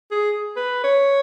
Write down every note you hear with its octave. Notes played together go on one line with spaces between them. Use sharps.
G#4
B4
C#5